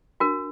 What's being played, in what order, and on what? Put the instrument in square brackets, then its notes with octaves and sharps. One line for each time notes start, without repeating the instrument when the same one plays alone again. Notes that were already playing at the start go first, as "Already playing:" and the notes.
[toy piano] D4 F#4 A#4